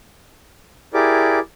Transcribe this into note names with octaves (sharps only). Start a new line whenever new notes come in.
E4 G4 G#4 A#4 D5 D6